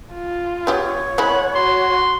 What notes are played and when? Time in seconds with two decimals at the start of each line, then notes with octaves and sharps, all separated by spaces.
0.14 F4
0.67 B3 G4 G#4 C#5
1.18 G#3 C4 E4 F#5 B5
1.55 F#4 C6